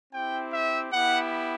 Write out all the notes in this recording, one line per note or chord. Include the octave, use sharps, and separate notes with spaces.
C4 E4 G4 G5
E5
B3 E4 G4 F#5